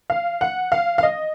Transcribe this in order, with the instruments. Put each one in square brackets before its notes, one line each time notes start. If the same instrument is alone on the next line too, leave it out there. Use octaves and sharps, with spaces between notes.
[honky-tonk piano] F5
F#5
F5
F5
D#5